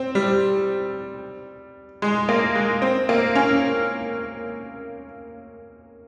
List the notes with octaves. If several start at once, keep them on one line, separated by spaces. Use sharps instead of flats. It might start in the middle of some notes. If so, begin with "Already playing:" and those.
Already playing: C4
G3
G#3
A#3
G#3
C4
A#3
C#4